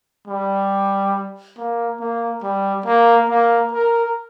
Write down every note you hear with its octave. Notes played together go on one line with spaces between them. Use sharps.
G3
A#3
A#3
G3
A#3
A#3
A#4